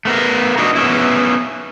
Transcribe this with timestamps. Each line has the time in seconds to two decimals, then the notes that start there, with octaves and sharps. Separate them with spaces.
0.05 A3 B3 A#4
0.57 D4 D#4 F#4
0.75 B3 C#4 E4